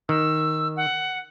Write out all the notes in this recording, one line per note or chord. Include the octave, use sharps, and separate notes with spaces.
D#3 E6
F#5